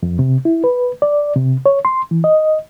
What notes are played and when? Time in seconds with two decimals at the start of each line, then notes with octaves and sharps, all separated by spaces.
0.03 F2
0.19 C3
0.45 E4
0.64 B4
1.02 D5
1.36 C3
1.66 C#5
1.85 C6
2.11 E3
2.24 D#5